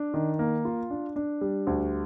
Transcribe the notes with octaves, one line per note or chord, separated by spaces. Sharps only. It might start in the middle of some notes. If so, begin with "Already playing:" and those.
Already playing: D4
D#3
A#3
F4
D4
D4
G3
D2